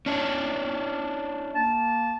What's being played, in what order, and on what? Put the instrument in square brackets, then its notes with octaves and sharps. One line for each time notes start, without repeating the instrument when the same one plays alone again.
[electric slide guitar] C#4 D4 E4
[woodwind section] A#3 A5